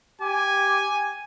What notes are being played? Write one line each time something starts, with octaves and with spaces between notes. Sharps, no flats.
G4 G#5